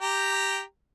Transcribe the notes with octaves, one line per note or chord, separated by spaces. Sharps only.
G4 G5 A#5